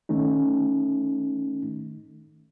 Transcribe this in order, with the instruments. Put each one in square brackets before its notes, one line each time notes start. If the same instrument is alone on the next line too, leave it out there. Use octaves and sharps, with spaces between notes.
[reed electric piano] D#3 A3 C#4 D#4